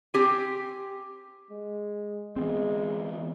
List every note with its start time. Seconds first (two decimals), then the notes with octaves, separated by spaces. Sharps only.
0.14 C4 G4 G#5
1.51 G#3
2.36 E3 G#3 B3 C4